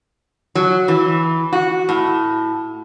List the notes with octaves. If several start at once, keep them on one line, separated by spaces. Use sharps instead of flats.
F#3
E3
F#4
A2